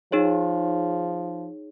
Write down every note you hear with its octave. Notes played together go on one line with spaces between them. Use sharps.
F3 D#4 G#4 C#5